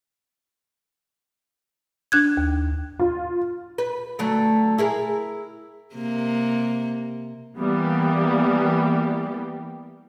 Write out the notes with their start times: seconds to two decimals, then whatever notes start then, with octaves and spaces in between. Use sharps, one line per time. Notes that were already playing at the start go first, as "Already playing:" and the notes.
2.12 D4 F#6 G#6
2.37 D#2
3.00 F4
3.78 B4
4.19 D3 F#3 A3
4.78 E4 G#4 A#4
5.95 C3 A#3
7.58 E3 G3 A#3 B3 G4